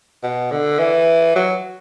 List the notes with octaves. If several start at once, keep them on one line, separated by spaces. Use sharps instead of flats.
B2
D3
E3
F#3